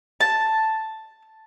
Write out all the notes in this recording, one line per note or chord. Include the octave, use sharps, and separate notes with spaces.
A5